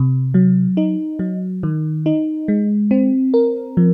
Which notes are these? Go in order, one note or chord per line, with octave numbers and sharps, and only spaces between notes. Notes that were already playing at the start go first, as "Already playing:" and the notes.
Already playing: C3
F#3
D#4
F#3
D#3
D#4
G#3
C4
A#4
F3